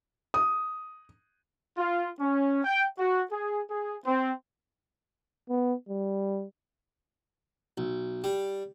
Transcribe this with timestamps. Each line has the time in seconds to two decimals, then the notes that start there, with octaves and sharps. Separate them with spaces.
0.34 D#6
1.77 F4
2.20 C#4
2.65 G5
2.99 F#4
3.32 G#4
3.70 G#4
4.05 C4
5.49 B3
5.89 G3
7.78 B1
8.24 G3